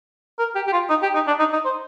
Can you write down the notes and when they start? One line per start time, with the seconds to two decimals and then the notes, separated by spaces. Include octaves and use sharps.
0.39 A#4
0.55 G4
0.67 G4
0.72 F4
0.89 D#4
1.02 G4
1.14 D#4
1.27 D4
1.39 D#4
1.52 D#4
1.65 C5